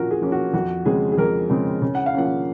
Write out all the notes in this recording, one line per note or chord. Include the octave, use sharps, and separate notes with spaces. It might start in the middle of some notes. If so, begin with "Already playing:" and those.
Already playing: A#2 F3 A#3 C#4 F#4 A#4
G#4
F3 A#3 C#4
F#4
F2 F#4
C#3 G#3 C4 G#4
G#4
F2 A#4
C#3 G#3 C4
C#3
F#5
F5
F3 A#3 C#4 F#5